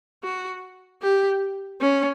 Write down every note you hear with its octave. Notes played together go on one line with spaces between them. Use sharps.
F#4
G4
C#4